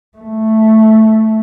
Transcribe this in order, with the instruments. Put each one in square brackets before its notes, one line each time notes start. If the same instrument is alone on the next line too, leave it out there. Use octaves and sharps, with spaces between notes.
[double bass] A3